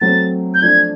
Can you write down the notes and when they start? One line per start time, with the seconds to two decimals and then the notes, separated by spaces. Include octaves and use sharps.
0.01 F#3 A3 C4 A6
0.54 G6
0.62 F3 A3 D4 G#6